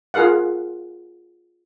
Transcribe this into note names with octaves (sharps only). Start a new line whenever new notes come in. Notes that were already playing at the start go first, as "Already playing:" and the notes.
F4 G#4 A#4 F5 F#5